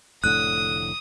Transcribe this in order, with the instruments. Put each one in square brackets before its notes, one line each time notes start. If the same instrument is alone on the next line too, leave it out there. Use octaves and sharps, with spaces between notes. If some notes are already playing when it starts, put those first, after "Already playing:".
[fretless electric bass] F1 A2 D3 [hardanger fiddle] D#6 [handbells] F#6